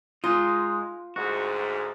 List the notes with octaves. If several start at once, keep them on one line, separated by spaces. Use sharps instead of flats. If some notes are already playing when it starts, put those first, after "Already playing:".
G#3 D#4 F4
D2 G#2 F#4